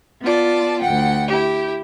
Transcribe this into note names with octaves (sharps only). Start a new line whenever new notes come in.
B3 F4 D5 A5
D2 F#5 G5
E4 G4